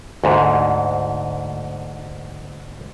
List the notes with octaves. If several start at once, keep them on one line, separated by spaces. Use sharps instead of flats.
D2 G#2